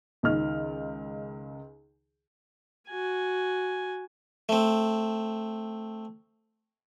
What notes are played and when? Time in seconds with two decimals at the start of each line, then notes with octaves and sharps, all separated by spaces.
0.23 C#2 D#3 F6
2.89 F#4 G#5
4.49 A3 C4